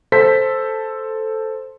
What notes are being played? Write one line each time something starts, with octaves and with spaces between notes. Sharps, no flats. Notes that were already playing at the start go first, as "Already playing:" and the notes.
A4 C5 B6